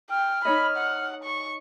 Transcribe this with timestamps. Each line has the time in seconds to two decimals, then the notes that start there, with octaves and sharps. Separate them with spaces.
0.10 G5 F6
0.45 D#4 C#5 D#5 B5
0.77 F#5
1.24 C#6